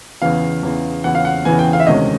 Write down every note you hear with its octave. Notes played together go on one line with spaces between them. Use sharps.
E2 C#3 E3 F5
E2 C#3 E3
E2 C#3 E3 F#5
F5
F#5
E2 C#3 E3 G#5
G5
F5
E5
D2 C3 D#3 G#3 C#4 D#5